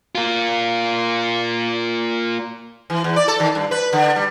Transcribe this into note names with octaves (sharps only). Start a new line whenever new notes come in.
A#3 F4
E3
E2
D5
A4
D#3
G2
B4
D3
G3